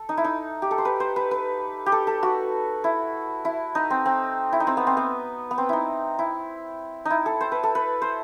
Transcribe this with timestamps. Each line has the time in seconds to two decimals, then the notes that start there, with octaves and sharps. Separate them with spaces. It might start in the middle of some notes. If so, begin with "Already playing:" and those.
Already playing: A4
0.09 D#4
0.17 E4
0.24 D#4
0.62 G4
0.71 A4
0.78 C5
0.85 B4
1.00 C5
1.16 B4
1.31 B4
1.86 G4
1.92 A4
2.07 A4
2.23 F#4
2.84 E4
3.45 E4
3.75 D#4
3.90 C4
4.06 C4
4.53 E4
4.60 D#4
4.67 C4
4.77 B3
4.87 C4
4.97 B3
5.51 B3
5.58 C4
5.69 D#4 E4
6.19 E4
7.05 D#4
7.10 E4
7.26 A4
7.41 C5
7.52 B4
7.63 A4
7.75 B4
8.02 C5